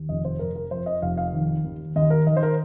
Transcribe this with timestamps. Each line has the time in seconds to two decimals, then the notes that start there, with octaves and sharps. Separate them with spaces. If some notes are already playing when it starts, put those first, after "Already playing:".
Already playing: D#2
0.09 F1 D#5
0.25 C5
0.39 F1 A#4
0.56 A#4
0.71 F2 C5
0.86 D#5
1.02 F1 F5
1.17 F5
1.33 D#3
1.65 D#2
1.96 D#2 D#5
2.10 A#4
2.26 D#3 D#5
2.37 C5
2.43 A#4